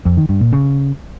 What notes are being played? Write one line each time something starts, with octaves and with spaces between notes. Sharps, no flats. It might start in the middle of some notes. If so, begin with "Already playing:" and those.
F2
D#3
G2
A#2
C#3